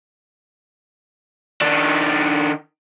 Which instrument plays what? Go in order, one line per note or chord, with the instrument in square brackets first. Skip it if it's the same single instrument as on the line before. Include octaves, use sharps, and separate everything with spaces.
[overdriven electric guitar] D#3 D4